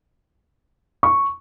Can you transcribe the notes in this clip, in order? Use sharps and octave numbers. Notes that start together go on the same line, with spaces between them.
C#6